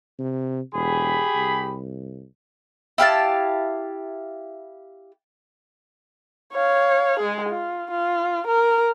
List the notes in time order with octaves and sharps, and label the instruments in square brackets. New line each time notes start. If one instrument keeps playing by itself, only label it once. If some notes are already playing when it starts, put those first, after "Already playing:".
[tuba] C3
[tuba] E1 [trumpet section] G4 G#4 B5
[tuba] C2
[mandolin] E4 G4 F5 A5
[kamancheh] C#5 F5
G#3 G#4
F4
F4
A#4